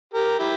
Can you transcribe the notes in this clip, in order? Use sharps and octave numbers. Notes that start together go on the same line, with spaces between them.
G4 A#4
E4 G4